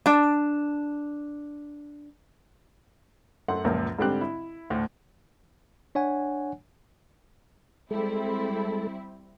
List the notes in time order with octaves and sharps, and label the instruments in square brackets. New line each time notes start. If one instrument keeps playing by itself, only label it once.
[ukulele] D4 A5
[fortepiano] F#2 A3 F#5 C6
C#2 F#2 A#2 F3
G#2 D3 G3 C4 G4 F#6
E4
D2 A2
[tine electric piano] D4 C#5 F#5 G#5
[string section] G3 C4 E4 [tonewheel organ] G#3 A4